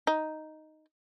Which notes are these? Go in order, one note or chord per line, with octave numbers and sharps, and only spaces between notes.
D#4